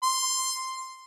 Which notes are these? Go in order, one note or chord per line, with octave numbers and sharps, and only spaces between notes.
C6